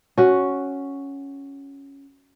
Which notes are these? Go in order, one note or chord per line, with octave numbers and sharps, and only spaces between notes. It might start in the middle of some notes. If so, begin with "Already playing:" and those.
C#4 F#4